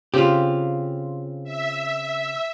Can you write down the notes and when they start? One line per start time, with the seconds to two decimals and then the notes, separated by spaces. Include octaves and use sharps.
0.14 C#3 C4 F4 G4
1.44 E5